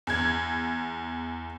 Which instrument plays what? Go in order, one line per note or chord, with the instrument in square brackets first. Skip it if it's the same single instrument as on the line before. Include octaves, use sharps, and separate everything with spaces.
[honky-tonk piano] E2 G#6